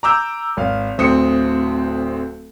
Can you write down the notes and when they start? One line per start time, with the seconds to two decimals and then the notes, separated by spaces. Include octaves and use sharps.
0.03 A#5 D6 E6 G6
0.57 G#1 F5
0.98 D1 D2 C4 D#6 C#7